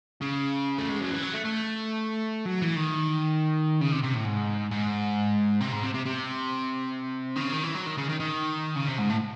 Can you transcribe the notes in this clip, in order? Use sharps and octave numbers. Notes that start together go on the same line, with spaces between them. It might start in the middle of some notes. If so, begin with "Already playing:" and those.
C#3
A3
G#3
F#3
E3
F#3
A3
A3
F#3
E3
D#3
C#3
C3
C3
A2
G#2
G#2
C3
G#2
C3
C3
C3
D#3
C#3
D#3
E3
F#3
D#3
C#3
D#3
D#3
C#3
C3
G#2
A2